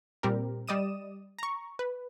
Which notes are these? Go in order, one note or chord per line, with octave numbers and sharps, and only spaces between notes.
A#2 G3 C4 G4 A#4
G3 D5 D#5 D#6 D#7 E7
A#5 C#6
B4